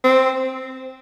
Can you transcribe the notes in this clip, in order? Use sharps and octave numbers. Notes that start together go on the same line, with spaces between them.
C4